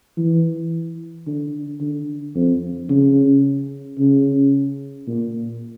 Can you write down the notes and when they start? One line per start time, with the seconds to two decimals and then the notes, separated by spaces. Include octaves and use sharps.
0.17 E3
1.26 D3
1.81 D3
2.35 F2
2.89 C#3
3.99 C#3
5.07 A#2